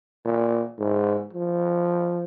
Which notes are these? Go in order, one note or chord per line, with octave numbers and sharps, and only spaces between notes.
A#2
G#2
F3